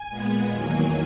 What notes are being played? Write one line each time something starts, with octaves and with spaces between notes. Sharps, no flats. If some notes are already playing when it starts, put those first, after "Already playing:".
Already playing: G#5
A#2 G#3 B3
E2 D#3 F#3 A#3